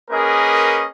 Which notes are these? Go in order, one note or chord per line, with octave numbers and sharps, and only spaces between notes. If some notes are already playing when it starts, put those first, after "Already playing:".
A#3 C#4 G#4 A#4 B4 D#5